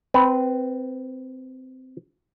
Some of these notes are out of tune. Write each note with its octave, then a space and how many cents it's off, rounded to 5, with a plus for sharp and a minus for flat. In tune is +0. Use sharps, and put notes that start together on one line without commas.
C4 -15 B4 +0